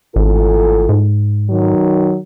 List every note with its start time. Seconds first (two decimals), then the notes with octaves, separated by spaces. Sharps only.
0.16 G#1 A2 F4 A4
0.89 G#2
1.50 D#3 F#3